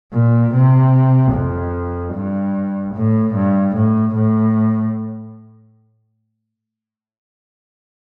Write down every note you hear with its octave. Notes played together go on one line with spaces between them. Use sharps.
A#2
C3
F2
G2
A2
G2
A2
A2